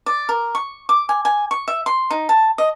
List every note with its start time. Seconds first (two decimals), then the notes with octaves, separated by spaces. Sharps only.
0.06 D5
0.29 A#4
0.55 C#6
0.89 D6
1.09 G#5
1.25 G#5
1.51 C#6
1.68 E5
1.86 C6
2.10 D#4
2.29 A5
2.58 D#5